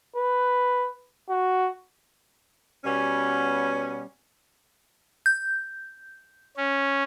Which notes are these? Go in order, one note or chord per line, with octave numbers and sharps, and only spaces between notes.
B4
F#4
B2 G3 B3 C#4
G6
C#4